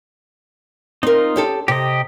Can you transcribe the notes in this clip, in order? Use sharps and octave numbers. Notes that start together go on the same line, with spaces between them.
C4 D#4 F4 A#4
C#4 G4 A4
C3 G4 D#5